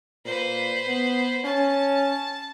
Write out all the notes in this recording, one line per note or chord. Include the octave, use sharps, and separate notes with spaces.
A#2 B4 C5
B3
C#4 A5